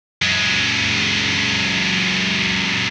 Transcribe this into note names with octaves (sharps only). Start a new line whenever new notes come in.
F#2 G#3